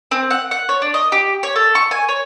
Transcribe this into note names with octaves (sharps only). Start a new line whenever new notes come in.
C4
F#5
F#5
C#5
D4
D#5
G4
C#5
A4
C#6
G#5
C#5